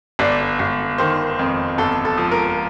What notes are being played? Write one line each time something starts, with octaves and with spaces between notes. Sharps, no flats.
G1 D5
G1
D#3 C5
F2
G1 A4
A4
F3
A#4